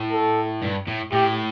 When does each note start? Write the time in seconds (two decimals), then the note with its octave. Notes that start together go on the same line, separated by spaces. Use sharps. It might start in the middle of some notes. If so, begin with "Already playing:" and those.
Already playing: A2
0.12 A4
0.62 G2
0.87 A2
1.12 A2 G4